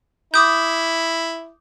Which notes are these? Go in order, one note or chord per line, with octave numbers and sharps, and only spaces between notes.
E4 D6 D#6 G6